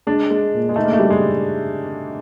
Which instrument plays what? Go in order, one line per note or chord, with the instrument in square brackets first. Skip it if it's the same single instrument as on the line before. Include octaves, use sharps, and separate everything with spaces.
[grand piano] G#3 [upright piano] D4
[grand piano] G#3
A#2
[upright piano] G#3
[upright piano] A3 [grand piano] D#4
[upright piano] A#3
A3
[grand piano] G3
[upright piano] G#3